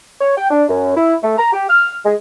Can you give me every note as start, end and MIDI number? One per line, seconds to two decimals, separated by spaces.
0.21 0.33 73
0.36 0.49 79
0.50 0.64 62
0.68 0.92 42
0.96 1.14 64
1.23 1.37 57
1.37 1.51 82
1.53 1.67 67
1.68 1.97 89
2.05 2.13 56